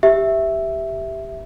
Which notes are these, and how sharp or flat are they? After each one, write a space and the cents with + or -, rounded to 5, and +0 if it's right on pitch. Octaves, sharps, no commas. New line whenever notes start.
G4 +0 E5 +0